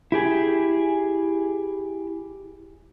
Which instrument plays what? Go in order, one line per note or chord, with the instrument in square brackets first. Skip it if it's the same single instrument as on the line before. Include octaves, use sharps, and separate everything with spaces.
[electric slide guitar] E4 G4 G#4